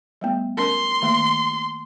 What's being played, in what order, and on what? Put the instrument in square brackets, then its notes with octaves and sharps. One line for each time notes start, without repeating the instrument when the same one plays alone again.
[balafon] G3 A3 B3
[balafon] C#4 A#4 [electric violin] C6
[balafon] D#3 A3 A#3